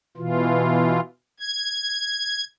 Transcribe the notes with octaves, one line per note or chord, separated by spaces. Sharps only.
B2 E3 F4
G#6